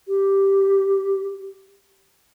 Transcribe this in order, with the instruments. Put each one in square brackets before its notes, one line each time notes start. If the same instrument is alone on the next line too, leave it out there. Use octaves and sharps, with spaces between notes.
[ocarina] G4